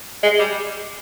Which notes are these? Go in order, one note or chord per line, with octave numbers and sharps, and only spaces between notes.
G#3
G3